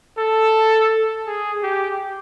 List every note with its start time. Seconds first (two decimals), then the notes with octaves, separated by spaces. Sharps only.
0.18 A4
1.27 G#4
1.62 G4